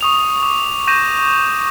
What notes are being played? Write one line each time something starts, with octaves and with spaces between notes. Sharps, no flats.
C#6 D#6 F7
D6
C#6 G6 A#6 D#7 E7